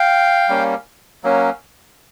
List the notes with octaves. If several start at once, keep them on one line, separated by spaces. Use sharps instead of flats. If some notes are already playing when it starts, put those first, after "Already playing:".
Already playing: F5 G5
G3 A#3 C#4
F#3 A#3 C#4